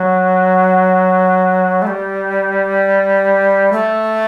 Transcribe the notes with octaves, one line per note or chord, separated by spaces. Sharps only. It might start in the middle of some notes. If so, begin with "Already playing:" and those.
Already playing: F#3
A3
G3
A3